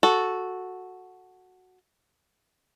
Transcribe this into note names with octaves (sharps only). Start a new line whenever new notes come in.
F#4 A4